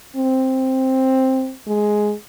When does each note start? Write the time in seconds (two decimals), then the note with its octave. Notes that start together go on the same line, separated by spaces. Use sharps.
0.16 C4
1.67 G#3